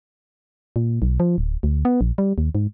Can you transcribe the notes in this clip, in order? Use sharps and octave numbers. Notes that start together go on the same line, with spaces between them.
A#2
B1
F3
D1
D2
B3
A#1
G3
D#2
G#2